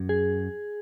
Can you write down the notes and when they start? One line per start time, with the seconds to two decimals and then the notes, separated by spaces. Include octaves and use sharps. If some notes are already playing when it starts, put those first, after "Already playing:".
Already playing: F#2
0.09 G#4